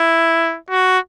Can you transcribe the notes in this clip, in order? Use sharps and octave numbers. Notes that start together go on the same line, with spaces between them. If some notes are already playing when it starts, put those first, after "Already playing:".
Already playing: E4
F#4